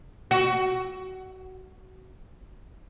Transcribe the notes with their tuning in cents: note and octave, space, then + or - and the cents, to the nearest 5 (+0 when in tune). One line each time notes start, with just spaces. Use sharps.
F#4 +20